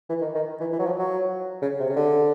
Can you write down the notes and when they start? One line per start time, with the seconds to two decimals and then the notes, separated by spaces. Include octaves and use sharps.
0.09 E3
0.21 D#3
0.35 D#3
0.60 E3
0.72 E3
0.79 F#3
0.86 F3
0.99 F#3
1.62 C#3
1.80 C3
1.89 C#3
1.96 D3